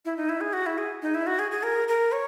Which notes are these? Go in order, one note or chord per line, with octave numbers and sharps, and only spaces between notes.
E4
D#4
E4
G#4
F#4
E4
G#4
D#4
E4
F#4
G#4
G#4
A#4
A#4
C#5